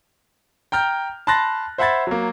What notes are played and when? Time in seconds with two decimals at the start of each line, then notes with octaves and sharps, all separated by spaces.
0.72 G5 A#5 F6 G6
1.27 A5 B5 C6 F#6 A6 A#6
1.78 C5 E5 F#5 B5 G#6 A6
2.07 F#3 A#3